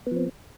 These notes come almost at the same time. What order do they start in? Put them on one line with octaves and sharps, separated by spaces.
B3 F3 C4